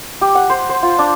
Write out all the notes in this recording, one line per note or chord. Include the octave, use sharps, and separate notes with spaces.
G4
F#5
C5
C5
F4
D4